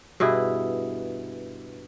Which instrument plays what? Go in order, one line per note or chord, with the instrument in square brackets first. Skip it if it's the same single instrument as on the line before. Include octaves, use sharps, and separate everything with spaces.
[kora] G2 B2 E4 G#4